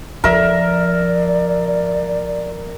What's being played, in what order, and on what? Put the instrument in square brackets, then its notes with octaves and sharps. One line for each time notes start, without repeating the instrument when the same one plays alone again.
[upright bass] E2 F3 [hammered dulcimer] A#4 E5 [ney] D5